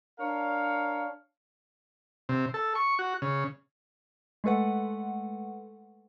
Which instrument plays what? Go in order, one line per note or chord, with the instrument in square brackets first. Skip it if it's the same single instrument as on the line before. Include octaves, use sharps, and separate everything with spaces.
[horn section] D4 A#4 C#5 F5
[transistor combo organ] C3
A4
C#6
F#4
C#3
[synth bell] G#3 A3 A4 B4 F#5